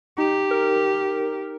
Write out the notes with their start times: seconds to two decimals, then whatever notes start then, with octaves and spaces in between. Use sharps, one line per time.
0.18 D#4 G4
0.51 A#4